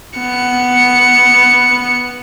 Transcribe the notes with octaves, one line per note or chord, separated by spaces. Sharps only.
B3 C#7